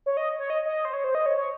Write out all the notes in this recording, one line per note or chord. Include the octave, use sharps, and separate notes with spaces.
C#5
D#5
C#5
D#5
D#5
C5
C#5
C5
D#5
C#5
C#5